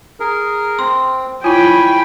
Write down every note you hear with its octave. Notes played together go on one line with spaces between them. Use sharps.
G#4 A#4
C4 C6
E4 F4 C#5 G5 G#5 B5